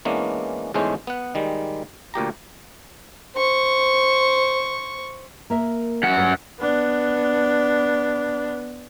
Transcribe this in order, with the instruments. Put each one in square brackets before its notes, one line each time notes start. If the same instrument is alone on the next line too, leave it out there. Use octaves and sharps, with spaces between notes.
[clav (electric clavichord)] E3 G#3 A#3 B3 C#4 D4
E2 G#2 G#3 A3 C#4 C5
B3 F#5
D#3 G3 G#3
D2 A#2 G4 A#5
[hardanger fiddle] C5 C#6
[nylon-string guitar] A#3 A#4 E5
[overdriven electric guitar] F#2 F#5
[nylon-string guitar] G2 A3
[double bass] B3 D4